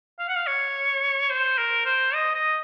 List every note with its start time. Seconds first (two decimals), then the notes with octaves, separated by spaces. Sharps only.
0.19 F5
0.29 F#5
0.37 F5
0.47 C#5
1.30 C5
1.58 A#4
1.86 C5
2.14 D#5
2.35 D#5